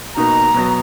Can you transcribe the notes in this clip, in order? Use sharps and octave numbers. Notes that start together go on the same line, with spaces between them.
B2 A#3 D#4 F#4 A#5
B2 F#3 B3